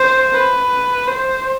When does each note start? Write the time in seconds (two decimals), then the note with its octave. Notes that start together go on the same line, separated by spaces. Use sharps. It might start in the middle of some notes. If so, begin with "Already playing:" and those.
Already playing: C5
0.33 B4
1.08 C5